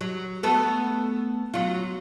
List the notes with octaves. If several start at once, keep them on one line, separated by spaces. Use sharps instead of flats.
F#3
A3 B3 A4
F#3 F4